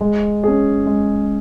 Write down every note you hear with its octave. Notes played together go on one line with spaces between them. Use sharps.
G#3
C#4 G#4
G#3